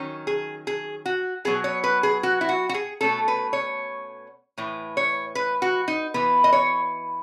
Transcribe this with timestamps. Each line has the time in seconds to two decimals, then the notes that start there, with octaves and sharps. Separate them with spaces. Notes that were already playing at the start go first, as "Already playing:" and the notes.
Already playing: D#3 F#3 C#4
0.27 G#4
0.67 G#4
1.06 F#4
1.45 B2 F#3 B3 G#4
1.64 C#5
1.84 B4
2.03 G#4
2.23 F#4
2.41 E4
2.49 F#4
2.69 F#4
2.74 G#4
3.01 B2 A3 C#4 A4
3.28 B4
3.53 C#5
4.58 A2 E3
4.97 C#5
5.35 B4
5.62 F#4
5.88 D#4
6.14 E3 B3 B4
6.44 D#5
6.53 C#5